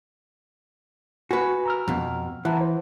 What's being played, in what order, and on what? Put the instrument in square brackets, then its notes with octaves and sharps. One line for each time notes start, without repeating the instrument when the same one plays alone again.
[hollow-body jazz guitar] F#4 B4 [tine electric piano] G#5
[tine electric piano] A#5 E6 F6
[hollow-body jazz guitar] F2 B2
[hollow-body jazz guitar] E3 [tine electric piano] F#5 A5 A#5
[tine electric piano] C5